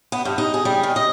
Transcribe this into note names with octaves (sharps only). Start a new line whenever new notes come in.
B3
G2
D#4
G#4
G3
D#3
D#5